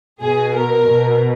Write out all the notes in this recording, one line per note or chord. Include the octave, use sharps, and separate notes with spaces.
B2 G#4
A#4
B2